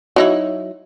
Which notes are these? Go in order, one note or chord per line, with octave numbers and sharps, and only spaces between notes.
F#3 D#4 E4